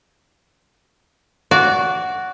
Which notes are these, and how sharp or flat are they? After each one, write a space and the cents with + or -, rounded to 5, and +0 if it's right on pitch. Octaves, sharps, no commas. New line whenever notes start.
F#4 +0 D5 -25